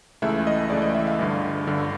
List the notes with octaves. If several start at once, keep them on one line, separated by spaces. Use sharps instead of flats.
C#2 C#3 E3 A3 E5
D#5
C#2 C#3 E3 A3 D5
D#5
E5
F5
G1 G2 D3
G1 G2 D3